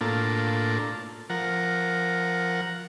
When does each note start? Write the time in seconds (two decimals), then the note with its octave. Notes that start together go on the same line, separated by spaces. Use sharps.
0.01 A2 A#3 D4 F4 A4
1.30 F3 A#4 F#5